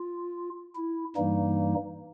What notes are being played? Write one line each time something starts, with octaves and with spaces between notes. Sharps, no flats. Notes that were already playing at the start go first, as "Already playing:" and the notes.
Already playing: F4
E4
G2 E3 G3 A#3 D#4